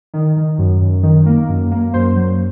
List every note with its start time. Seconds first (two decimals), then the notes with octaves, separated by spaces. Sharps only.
0.14 D#3
0.36 D#3
0.59 F#2
0.81 F#2
1.03 D#3
1.26 A#3
1.49 F#2
1.71 A#3
1.94 F#2 C5
2.16 F#3